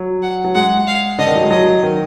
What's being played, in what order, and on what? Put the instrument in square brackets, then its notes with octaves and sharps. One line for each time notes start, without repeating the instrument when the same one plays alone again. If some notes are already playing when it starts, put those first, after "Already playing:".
Already playing: [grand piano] F#3
[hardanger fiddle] F#5
[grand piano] F#3
[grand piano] G#3 [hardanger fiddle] F#5
[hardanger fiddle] F5
[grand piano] D3 [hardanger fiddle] D#5
[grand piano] D#3
F#3
G#3
[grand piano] F#3 [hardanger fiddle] D#5
[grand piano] D#3